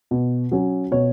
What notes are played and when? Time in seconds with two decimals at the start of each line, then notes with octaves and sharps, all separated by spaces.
0.11 B2
0.52 F#3 C#4
0.91 B2 C#5